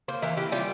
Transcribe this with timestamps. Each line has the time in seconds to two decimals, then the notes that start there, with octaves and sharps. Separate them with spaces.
0.08 A#3 C5
0.22 E3 A#4
0.37 E3 G4
0.52 G3 F4